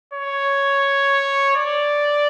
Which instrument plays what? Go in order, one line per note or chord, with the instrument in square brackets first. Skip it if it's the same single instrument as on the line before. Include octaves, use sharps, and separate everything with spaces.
[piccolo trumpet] C#5
D5